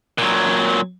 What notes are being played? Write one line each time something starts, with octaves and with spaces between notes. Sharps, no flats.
A#2 F#3